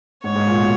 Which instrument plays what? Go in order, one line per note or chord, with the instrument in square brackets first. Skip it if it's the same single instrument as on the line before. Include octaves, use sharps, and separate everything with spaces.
[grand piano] G#2 [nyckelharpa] C#5
[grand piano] G#2
A#2
B2